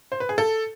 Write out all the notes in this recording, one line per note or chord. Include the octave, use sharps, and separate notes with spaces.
C5
B4
G#4
A4